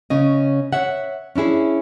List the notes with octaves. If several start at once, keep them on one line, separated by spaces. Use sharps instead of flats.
C#3 C#4 D#5
C#5 E5 F#5
C#4 D4 E4 G#4